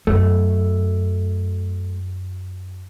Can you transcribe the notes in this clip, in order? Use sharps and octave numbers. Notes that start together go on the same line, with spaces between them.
F#2 A3